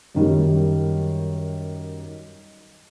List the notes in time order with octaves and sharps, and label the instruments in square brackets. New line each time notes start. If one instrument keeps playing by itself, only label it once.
[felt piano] F#2 D#3 G3